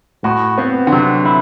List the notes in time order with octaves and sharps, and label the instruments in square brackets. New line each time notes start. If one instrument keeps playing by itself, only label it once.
[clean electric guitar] A2 [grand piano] F#4
[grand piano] B3 [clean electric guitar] C4
[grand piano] D3
[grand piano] C3 [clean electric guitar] F#3
[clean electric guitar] E4